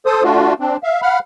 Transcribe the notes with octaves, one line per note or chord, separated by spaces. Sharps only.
A4 C5 D#6
A3 D4 F4 F#4
C4 D4
E5 F5
F5 F#5 B5 F6